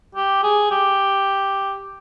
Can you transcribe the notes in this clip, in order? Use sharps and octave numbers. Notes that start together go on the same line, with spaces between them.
G4
G#4
G4